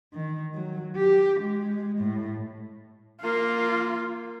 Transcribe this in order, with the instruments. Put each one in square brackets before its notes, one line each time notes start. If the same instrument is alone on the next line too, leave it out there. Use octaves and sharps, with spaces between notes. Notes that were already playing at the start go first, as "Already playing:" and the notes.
[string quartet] D#3
F#3
G4
G#3
A2
[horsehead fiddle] A#3 F4